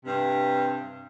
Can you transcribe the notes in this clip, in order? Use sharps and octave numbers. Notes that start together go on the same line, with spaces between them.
G2 C3